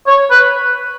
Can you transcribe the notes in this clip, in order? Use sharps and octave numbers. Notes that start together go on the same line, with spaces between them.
C#5
B4